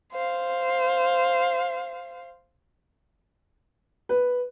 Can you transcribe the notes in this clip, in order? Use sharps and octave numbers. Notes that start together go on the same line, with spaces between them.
C5 F5
B4